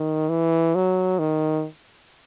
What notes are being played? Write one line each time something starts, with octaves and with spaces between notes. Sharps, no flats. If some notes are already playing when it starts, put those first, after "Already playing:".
Already playing: D#3
E3
F#3
D#3